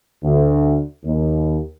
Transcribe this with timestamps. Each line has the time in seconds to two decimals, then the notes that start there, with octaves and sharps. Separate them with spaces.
0.23 D2
1.04 D#2